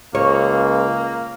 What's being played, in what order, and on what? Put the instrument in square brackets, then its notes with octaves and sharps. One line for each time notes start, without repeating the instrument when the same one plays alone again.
[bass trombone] C#2 [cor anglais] A#3 [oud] C#5